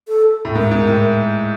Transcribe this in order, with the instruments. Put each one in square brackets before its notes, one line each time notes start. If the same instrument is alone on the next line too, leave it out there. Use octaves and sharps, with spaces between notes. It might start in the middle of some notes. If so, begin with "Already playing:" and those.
[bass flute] A4
[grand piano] A2
[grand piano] G#2 [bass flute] A#4
[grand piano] G#2
A2